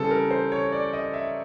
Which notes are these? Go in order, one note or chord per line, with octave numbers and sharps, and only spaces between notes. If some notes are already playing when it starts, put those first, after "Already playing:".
Already playing: C#3 E3 G3 C4 A4
A#4
C5
C#5
D5
D#5
E5